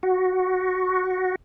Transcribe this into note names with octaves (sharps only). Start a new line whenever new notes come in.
F#4